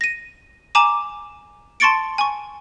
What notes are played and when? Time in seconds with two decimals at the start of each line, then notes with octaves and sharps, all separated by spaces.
0.01 A#6 D#7
0.75 G#5 A#5 D6 E7
1.80 A5 C6 C#6 A6 C#7 D7
2.18 G#5 C#6